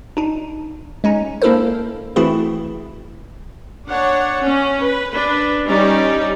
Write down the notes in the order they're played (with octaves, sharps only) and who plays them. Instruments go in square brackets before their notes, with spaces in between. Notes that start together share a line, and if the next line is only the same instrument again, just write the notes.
[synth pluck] D4 D#4
G#3 C#4 D#4
A#3 D4 E4 A4 A#4 C5
E3 A3 C4 E4 F#4 G#4
[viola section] D4 C#5 F#5
C#4
B4
D4 B4
G3 C#4 D#4 G4 D5